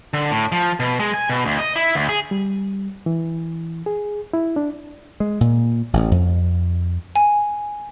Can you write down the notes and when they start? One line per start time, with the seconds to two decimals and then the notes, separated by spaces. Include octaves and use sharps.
0.13 D3
0.31 A2
0.52 F3
0.80 B2
1.00 G#3
1.14 G#5
1.30 B2
1.45 D2
1.59 D#5
1.76 E4
1.95 D2
2.09 G#4
2.31 G3
3.06 E3
3.86 G#4
4.33 E4
4.56 D4
5.20 G#3
5.41 A#2
5.93 A1
6.11 F2
7.15 G#5